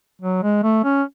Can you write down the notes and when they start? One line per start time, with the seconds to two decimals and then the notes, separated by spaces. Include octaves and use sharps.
0.21 F#3
0.43 G#3
0.64 A3
0.84 C#4